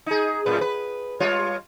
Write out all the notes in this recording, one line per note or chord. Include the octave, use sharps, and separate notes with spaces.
D#4 G#4
F#2 A2 B4
B4
G3 F4 C#5